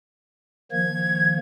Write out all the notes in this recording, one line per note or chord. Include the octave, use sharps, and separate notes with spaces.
D#3 F3 A#3 G#6